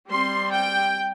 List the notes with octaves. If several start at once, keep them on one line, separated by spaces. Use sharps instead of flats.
G3 C4 C6
G5